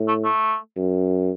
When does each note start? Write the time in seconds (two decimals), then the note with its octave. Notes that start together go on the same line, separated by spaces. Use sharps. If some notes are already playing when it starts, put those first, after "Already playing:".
Already playing: A2
0.08 A3
0.25 A3
0.77 F#2